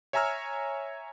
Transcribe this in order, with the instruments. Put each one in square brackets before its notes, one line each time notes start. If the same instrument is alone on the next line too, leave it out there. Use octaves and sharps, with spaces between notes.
[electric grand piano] C#5 E5 G#5 A#5 E6 F6